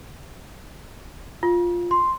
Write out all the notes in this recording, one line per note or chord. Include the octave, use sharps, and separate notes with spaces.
F4
C6